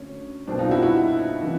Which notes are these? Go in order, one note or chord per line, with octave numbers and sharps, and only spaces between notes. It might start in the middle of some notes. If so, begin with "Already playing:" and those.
Already playing: D2 D3 C#4
C2 B2 C4 D4
D#4 F4
E4 F#4
E4 F#4
C#3 E3